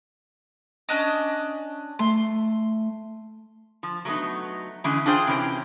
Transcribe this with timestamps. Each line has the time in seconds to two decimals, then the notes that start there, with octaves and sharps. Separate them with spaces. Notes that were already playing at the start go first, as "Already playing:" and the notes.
0.89 C#4 D4 D#5
1.99 A3 C6
3.83 F3
4.05 F#3 A3 B3 D#4
4.84 D3 E3 G#3 C#4
5.06 D4 F4 G#4 C5 G5
5.27 C3 E3 C#4 B4 G5